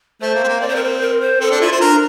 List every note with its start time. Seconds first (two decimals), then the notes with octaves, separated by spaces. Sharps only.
0.21 A3 C5
0.35 A#3
0.44 C4
0.48 A#3
0.61 C4 D5
0.68 C5
0.76 A#4
0.84 C5
1.01 A#4
1.21 C5
1.40 C4 A4
1.51 D4
1.61 E4 F4
1.72 C5
1.81 D4 A#4